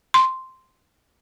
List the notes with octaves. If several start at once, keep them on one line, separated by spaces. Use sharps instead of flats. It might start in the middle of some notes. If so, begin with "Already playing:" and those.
C6